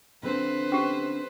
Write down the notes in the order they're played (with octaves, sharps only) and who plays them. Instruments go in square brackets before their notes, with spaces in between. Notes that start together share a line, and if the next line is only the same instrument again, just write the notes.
[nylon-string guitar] D3 C4 D4 [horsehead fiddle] B4 C5
[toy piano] C#4 G4